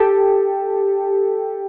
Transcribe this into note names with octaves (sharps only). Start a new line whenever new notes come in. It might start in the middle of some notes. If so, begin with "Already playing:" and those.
Already playing: G4 A4